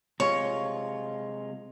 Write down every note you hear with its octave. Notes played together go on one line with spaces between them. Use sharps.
C3 G#3 F4 C#5